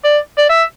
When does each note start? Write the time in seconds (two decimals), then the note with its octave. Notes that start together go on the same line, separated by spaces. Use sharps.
0.05 D5
0.38 D5
0.49 E5